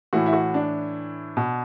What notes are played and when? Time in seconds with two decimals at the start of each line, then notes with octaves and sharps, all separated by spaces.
0.13 A2 E3 F#4
0.26 E4
0.33 F#4
0.54 D4
1.37 B2